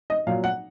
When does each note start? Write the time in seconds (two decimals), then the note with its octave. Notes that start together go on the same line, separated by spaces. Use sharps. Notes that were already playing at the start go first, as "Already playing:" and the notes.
0.10 D#5
0.27 A#2 F#3 F5
0.44 F#5